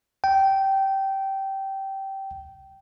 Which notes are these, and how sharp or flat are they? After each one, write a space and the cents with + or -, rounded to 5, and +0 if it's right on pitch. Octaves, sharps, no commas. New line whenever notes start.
G5 -15